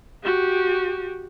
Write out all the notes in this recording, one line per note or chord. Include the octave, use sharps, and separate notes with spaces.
F#4 G4